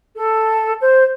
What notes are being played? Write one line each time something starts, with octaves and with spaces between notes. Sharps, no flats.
A4
C5